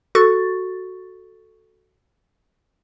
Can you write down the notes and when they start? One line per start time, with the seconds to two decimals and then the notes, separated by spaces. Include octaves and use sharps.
0.15 F#4 A4 C#6 A6